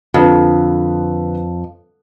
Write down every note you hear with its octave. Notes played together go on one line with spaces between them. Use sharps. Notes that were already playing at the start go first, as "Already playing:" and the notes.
F2 D3 D4 B4